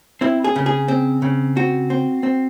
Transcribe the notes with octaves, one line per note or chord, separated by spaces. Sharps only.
C4 E4
G#4
C#3
G#4
C4
C#3
C4 F#4
C4
C4